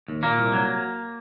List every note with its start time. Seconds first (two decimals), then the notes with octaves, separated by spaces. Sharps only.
0.08 D#2
0.23 A#2 A#3
0.38 C2
0.53 F#3